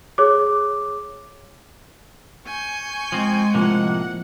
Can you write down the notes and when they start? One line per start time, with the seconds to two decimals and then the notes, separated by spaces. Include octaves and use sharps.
0.18 G#4 C#5 D6
2.46 G#5 C#6 G6
3.12 F3 G#3 C4
3.55 A2 C3 F3 A#3 F#5